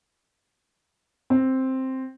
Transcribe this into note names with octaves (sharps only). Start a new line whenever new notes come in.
C4